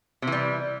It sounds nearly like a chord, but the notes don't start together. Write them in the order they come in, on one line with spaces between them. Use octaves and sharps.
C3 E3 G3